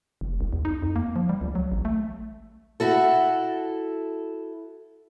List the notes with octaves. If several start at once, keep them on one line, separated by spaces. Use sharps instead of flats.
F1
C2
E2
D#4
F2
A#3
F3
G3
C#2
F#3
A1
A3
E4 F#4 A4